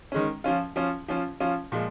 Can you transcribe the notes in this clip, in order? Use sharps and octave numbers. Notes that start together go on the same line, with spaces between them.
D#3 G#3 C#4
F3 C#4 F4
F3 C#4 F4
F3 C#4 F4
F3 C#4 F4
A#2 F3 G#3